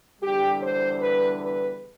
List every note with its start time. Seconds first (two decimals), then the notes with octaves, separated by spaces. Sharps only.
0.21 E2 D3 G3 G4
0.62 C5
1.00 B4
1.39 B4